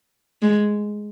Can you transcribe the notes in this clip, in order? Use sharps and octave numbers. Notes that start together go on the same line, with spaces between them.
G#3